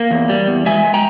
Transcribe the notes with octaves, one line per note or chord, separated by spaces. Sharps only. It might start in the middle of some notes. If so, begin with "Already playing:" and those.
Already playing: A#3
E2
G3
E2
G#3 E5 G#5
G#3
G5 A#5